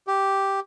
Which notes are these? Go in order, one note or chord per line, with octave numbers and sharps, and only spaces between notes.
G4